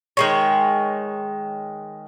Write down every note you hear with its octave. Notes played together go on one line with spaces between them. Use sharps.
D#3 G#3 C#5